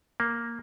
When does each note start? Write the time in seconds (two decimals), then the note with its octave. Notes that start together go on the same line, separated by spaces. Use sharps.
0.20 A#3